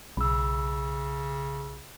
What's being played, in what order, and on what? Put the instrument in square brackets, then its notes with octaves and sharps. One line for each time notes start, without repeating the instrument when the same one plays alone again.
[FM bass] B1 [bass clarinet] C#3 [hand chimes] B5 E6